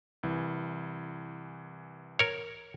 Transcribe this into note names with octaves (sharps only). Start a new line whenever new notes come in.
C2 E3
A#4 C#5